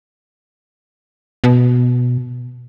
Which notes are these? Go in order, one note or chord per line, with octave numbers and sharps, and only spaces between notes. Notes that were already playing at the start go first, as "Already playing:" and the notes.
B2